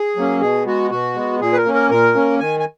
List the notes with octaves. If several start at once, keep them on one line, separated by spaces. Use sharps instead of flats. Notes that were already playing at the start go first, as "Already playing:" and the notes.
Already playing: G#4
F#3 A#3 C#4
B2 G#4
G#3 B3 F#4
B2 F#4
G#3 B3
A#2 G#4
B4
A#4
A#3 C#4
A#4
A#2 A#4
A#3 C#4
D#3 G#5
G#5